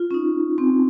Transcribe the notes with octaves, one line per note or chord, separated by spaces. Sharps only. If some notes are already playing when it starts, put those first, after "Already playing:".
Already playing: F4
C#4
D#4
C4